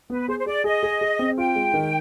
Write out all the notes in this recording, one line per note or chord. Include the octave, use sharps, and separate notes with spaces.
B3 B4
G#4 C5
C5
G#4 D5
G#4 D#5
G#4
G#4
C4
F4 G5
G#3
D#3